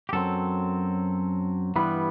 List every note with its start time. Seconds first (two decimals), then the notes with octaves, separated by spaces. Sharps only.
0.09 G4
0.13 F#2 F#3 C4 A4
1.76 G2 E3 G3 B3 B4